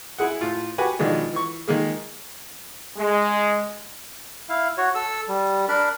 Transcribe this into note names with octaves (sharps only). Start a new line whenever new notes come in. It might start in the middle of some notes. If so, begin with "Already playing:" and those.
E4 G#4 F#5
A2 F4
F#4 G4 B4 G#5
B2 D#3 F3 G#3 D4
E3 C#6
D#3 G#3 A#3 G#4
G#3
E4 F5
F#4 C#5
A4 E6
G3
D4 A#4 B5